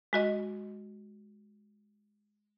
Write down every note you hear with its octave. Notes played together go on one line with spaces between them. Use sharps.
G#3 F#4 D#5